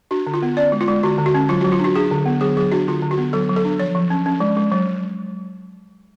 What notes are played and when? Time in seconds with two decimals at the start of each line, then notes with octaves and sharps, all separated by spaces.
0.11 D4 F#4
0.27 D3
0.34 F4
0.42 B3
0.57 C#4 D5
0.72 G#3
0.81 F4
0.88 G#3
1.03 D3 F#4
1.18 D3
1.26 F#4
1.34 C#4
1.49 F#3 F4
1.61 F#4
1.64 F#3
1.72 F4
1.79 D4 F#4
1.96 D4 G#4
2.11 D3
2.26 B3
2.41 F#3 G#4
2.57 F#3 G#4
2.72 D4 F#4
2.88 D3 F4
3.03 D3
3.11 F#4
3.18 B3
3.33 F#3 A4
3.49 F#3
3.56 A4
3.65 D4
3.79 F3 C#5
3.95 F3
4.10 C#4
4.26 C#4
4.40 G#3
4.57 G#3
4.72 F#3